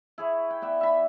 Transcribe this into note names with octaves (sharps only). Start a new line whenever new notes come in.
E4 G#4 C#5
G5
B3 D5 E5 G5
E5 B5